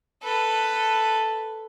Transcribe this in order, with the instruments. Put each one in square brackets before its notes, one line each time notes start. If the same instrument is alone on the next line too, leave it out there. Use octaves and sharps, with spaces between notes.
[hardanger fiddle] A4 B4